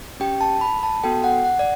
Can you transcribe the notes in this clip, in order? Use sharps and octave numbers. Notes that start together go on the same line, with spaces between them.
C#4 G4 G5
A5
B5
A5
B3 F#4 A4 G5
F#5
F#5
D5